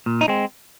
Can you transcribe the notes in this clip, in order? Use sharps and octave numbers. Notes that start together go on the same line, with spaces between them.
A#2
D#4
G#3 C4